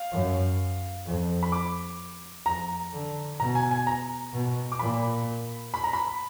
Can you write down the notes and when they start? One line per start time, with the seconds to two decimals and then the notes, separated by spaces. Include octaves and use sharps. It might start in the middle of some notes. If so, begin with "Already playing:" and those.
Already playing: F5
0.12 F#2
1.07 F2
1.43 B5
1.52 D6
2.46 F2 A#5
2.93 D3
3.40 B2 A#5
3.55 G#5
3.71 G#5
3.87 A#5
4.34 B2
4.72 D6
4.79 A#2 B5
5.74 B5
5.84 A#5
5.93 B5